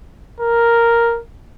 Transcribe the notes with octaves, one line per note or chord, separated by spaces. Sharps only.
A#4